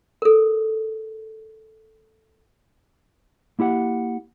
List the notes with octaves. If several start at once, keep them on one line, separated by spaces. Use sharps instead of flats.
A4 A#4
A#3 E4 G4 F#5